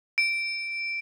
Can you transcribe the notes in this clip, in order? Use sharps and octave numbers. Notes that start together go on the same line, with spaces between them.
D7